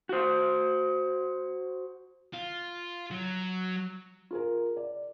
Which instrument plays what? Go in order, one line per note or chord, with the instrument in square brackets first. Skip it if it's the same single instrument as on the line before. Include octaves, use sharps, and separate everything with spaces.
[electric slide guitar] F#4 C5
[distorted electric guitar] F4
F#3
[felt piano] F4 G#4 A#4
D5